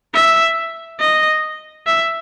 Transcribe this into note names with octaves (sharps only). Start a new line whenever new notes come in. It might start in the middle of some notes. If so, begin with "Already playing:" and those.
E5
D#5
E5